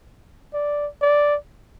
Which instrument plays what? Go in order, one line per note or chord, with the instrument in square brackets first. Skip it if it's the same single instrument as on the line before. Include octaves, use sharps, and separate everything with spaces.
[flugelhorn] D5
D5